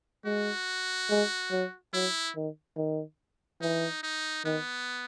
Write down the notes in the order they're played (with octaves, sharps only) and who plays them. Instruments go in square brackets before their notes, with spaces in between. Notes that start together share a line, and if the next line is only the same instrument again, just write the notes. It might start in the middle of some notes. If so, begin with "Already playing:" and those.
[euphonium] G#3 [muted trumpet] F#4
[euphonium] G#3
F#3
[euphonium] F#3 [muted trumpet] E4
[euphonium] D#3
D#3
[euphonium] E3 [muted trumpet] D#4
[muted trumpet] D#4
[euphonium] D#3 [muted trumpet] B3